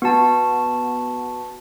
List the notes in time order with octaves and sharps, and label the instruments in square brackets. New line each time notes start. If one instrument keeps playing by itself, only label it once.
[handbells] B3 F#4 A5